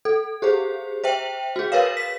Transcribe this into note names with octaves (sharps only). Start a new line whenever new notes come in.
A4
G4 G#4 C5
C5 E5 G5
F#4 G#4
A#4 B4 C#5 F5
B6